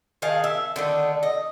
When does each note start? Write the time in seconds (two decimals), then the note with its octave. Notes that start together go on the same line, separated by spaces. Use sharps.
0.22 D#3 G#4 F5 A5
0.44 E5
0.76 D3 D#3 A3
1.23 D#5